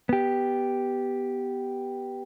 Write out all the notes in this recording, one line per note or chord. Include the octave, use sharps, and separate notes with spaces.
B3 G4